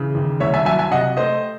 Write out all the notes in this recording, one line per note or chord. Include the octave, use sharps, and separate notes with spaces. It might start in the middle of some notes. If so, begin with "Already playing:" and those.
Already playing: C#3 E3
D#2
C2 C#5 E5
E5 G#5
F#3 E5 G#5
E5 G#5
C3 D#5 F#5
A3 C5 D#5